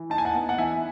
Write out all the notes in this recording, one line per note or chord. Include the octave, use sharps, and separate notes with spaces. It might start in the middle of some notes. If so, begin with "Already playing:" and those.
Already playing: E3
D#4 A5
G#5
F#5 A5
B3
F#5
E3 E5 G#5